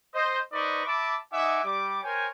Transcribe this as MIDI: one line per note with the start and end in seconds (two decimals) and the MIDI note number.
0.14 0.39 72
0.14 0.39 75
0.52 0.83 63
0.52 0.83 71
0.52 0.83 72
0.52 0.83 74
0.52 0.83 75
0.52 0.83 85
0.86 1.16 76
0.86 1.16 81
0.86 1.16 83
0.86 1.16 86
1.33 1.62 63
1.33 1.62 75
1.33 1.62 76
1.33 1.62 78
1.33 1.62 80
1.33 1.62 86
1.64 1.99 55
1.64 1.99 86
2.03 2.28 70
2.03 2.28 72
2.03 2.28 73
2.03 2.28 79
2.03 2.28 80